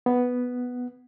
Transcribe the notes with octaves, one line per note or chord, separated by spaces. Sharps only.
B3